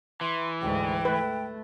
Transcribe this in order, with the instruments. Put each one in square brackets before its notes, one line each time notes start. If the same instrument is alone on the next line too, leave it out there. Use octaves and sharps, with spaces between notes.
[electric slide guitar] E3 [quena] C6
[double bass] D2 G#2 [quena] G5
[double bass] A3 [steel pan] B4